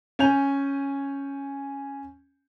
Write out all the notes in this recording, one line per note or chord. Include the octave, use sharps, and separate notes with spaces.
C#4 G#5 G6 F7